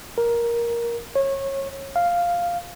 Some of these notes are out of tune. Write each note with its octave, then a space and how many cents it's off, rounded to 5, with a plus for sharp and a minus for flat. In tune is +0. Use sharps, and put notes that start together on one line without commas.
A#4 +10
C#5 -25
F5 +0